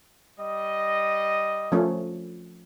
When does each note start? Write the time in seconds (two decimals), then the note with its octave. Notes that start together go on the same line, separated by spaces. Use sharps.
0.38 G3 D#5
1.72 F3 A3 C#4